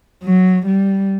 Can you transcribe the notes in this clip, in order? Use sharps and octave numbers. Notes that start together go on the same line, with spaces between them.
F#3
G3